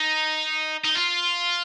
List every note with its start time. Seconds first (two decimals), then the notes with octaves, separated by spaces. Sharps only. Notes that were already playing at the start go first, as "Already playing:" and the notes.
Already playing: D#4
0.84 D#4
0.95 F4